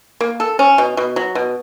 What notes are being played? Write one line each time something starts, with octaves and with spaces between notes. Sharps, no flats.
A#3
A4
C#4
B2
B2
F#3
B2